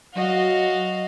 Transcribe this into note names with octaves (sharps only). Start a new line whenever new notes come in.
F#3 F#4 D#5 F5